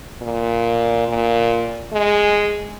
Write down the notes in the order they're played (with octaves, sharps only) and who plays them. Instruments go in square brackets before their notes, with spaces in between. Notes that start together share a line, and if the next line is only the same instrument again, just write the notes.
[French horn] A#2
A#2
G#3